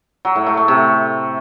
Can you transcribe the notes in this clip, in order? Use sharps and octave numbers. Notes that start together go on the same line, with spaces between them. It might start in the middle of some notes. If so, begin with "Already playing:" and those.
F#3
A2
A3
A3
C3